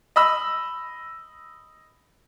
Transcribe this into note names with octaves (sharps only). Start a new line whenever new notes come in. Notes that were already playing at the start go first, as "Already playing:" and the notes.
D#5 B5 E6